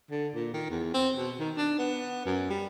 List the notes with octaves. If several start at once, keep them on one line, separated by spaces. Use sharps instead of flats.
D3
A#2
D#3
E2
C4
B2
D#3
D4
B3
F#2
G3